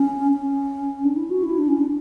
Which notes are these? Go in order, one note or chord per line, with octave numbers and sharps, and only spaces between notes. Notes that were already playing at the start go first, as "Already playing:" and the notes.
Already playing: C#4
C#4
D4
E4
F#4
E4
D4
C#4
D4